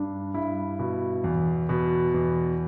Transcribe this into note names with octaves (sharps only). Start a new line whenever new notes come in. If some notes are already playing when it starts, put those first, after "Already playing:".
Already playing: G2 D4
G2 E4
B2
E2
B2
E2